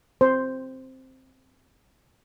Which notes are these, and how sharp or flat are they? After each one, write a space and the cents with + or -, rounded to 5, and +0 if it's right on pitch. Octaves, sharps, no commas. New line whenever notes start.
C4 +0 C5 +0